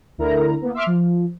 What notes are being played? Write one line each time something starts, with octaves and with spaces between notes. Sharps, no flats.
D2 D3 E4 A#4 A#5
A#3 B3
E5 C6 D6 F6
F3